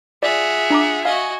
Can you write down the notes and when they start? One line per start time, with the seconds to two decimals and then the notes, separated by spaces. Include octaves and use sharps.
0.23 F4 G#4 D5 E5 F#5
0.70 D4 A#5 D6
1.05 F#4 D#5 F5 G#5